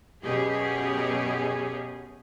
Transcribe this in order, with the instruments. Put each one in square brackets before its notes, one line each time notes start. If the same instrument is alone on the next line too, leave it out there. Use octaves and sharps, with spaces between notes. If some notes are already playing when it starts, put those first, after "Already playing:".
[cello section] F#2 B2 C#4 G4 G#4